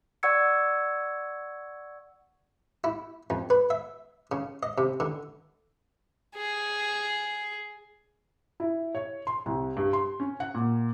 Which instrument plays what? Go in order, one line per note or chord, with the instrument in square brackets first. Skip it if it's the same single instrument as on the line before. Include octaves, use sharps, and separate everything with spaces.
[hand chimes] D5 F#5 C#6 E6 G#6 C#7
[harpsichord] E4
F2
B4
E5
C#3
D#5
C3
D3
[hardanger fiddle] G#4
[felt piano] E4
C#5
C6
C2
G2
C6
C#4
F#5
A#2